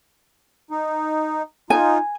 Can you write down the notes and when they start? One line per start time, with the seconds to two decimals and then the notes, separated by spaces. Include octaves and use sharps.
0.71 D#4
1.70 D#4 F4 G#5